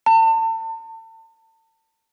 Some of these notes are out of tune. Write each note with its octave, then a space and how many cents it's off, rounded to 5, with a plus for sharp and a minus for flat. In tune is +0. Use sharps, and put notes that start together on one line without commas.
A5 +35